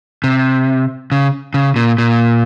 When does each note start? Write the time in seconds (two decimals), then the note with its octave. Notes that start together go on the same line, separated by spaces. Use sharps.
0.24 C3
1.12 C#3
1.54 C#3
1.76 A#2
1.98 A#2